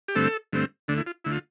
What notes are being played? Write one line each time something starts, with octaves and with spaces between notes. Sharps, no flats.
G4
G2 D3 A3 C4 A4
G2 D3 A3 C4
D2 D3 A3 D4
E4
F4
D2 D3 A3 E4
F4